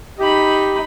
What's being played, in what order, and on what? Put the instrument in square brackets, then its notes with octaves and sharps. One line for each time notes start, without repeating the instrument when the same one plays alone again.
[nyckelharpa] D#4 B5 [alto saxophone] G4